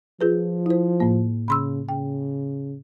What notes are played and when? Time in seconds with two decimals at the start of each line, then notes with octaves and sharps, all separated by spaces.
0.21 F3 F4 G#4 B4
0.66 E4 C5
1.00 A2 A#3
1.48 C#3 B5 C6 E6
1.89 C#3 G5